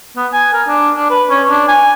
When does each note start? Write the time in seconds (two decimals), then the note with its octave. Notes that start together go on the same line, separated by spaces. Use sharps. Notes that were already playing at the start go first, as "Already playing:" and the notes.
0.16 B3
0.33 G#5
0.53 A#4
0.68 D4
0.95 D4
1.10 B4
1.30 C#4
1.51 D4
1.68 G#5